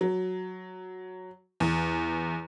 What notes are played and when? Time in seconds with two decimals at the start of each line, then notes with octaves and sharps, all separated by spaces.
0.01 F#3
1.60 E2